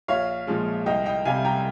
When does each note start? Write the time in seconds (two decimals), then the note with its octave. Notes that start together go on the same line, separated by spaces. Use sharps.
0.08 A#1 C#5 F5
0.47 A#2 F3 G#3
0.86 C2 D#5 G5
1.06 D#5 G5
1.25 C3 G3 F5 G#5
1.45 G5 A#5